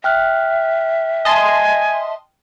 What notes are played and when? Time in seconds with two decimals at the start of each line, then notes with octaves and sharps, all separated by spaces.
0.04 E5 G5 F6 F#6
1.25 D#5 G#5 A5 C6